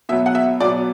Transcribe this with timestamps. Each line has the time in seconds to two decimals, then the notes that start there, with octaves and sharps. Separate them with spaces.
0.09 B2 F#3 B3 E5
0.26 F#5
0.35 E5
0.60 B2 F#3 B3 D5